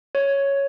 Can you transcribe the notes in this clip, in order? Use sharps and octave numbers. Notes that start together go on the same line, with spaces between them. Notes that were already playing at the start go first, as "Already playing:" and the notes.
C#5